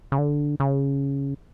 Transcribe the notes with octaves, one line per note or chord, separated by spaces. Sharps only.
C#3
D3
C#3